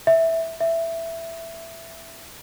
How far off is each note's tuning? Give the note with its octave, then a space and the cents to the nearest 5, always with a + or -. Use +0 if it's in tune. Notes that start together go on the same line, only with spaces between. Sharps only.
E5 -5
E5 +10